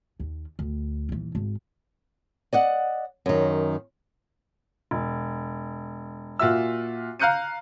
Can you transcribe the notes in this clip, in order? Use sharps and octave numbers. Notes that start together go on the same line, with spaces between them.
D#2
D2
D#1 E3
G#1
D5 D#5 F#5
F#2 D#3
E1
A#2 F4 F#4 E5 E6
F5 A#5 F#6 G6 C#7 D#7